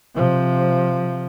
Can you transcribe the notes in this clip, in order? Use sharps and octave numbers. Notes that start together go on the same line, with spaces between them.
C3 F3